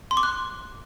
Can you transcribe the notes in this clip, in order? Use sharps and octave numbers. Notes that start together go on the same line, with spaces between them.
C6
D6
F#6